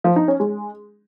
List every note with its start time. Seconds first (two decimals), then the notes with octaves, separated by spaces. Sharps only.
0.04 F3
0.16 D#4
0.28 C#4
0.40 G#3